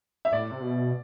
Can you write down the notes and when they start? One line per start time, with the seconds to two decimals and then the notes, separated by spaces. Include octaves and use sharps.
0.25 E5
0.32 A2 D5
0.51 C3
0.62 B2